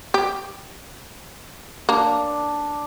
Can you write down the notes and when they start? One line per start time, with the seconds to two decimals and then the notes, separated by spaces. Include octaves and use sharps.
0.14 G4
1.89 A#3 D4